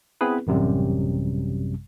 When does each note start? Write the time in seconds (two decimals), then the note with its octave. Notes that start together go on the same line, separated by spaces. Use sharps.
0.21 B3 C4 E4 G#4 B4
0.47 A1 F#2 C3 G3